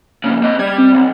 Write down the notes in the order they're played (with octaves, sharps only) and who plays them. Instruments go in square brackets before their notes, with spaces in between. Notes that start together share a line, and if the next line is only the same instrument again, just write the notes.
[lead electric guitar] F2 C#3 [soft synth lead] A#3
[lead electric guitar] C4 D#5
[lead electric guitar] G3 [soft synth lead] G#6
[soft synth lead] C4
[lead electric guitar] B1